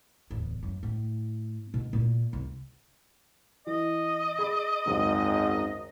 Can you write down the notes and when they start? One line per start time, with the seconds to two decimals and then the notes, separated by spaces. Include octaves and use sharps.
0.30 D1 E2
0.63 F#2
0.83 A2
1.74 B2
1.93 A#2 A#3
2.33 C2
3.67 E3 D#5
4.39 G#4 B5
4.87 G#1 C#2 F#2 G#3